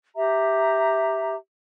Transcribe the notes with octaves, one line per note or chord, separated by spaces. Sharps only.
G4 E5 A#5